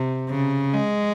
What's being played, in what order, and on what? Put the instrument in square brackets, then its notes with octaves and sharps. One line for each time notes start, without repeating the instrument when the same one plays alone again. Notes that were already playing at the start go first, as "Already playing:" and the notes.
Already playing: [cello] C3
C#3
G#3